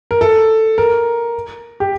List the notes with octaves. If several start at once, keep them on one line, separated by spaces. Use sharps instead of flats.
A#4
A4
A#4
G4